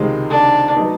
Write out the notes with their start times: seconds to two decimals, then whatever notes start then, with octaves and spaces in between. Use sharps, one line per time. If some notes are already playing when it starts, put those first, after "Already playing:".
Already playing: C#2 C3 D#3 G#3
0.30 D4
0.76 F#3 B3 D#4